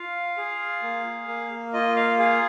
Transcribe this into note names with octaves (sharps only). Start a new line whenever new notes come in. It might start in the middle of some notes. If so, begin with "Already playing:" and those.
Already playing: F4 F5
G#4
A#3
A#3
F4 D#5
F5
G#4 F5